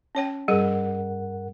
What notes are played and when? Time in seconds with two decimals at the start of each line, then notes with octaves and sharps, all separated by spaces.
0.15 C#4 C#5 G5
0.48 G2 G3 G#4 A#4 F#5